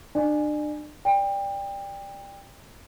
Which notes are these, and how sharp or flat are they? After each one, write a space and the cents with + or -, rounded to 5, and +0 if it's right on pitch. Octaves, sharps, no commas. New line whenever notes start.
D4 +35 D5 +35 G#5 +0
D5 -5 G5 +25